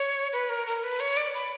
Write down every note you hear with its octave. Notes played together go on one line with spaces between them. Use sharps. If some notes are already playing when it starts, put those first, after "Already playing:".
Already playing: C#5
B4
A#4
A#4
B4
C#5
D5
B5